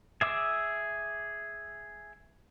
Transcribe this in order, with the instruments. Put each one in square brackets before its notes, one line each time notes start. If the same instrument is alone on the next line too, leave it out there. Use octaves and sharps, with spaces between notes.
[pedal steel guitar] G#4 E5 D6 E6